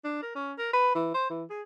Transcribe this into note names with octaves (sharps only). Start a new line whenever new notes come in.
D4
A#4
C#4
A#4
B4
E3
C5
E3
G#4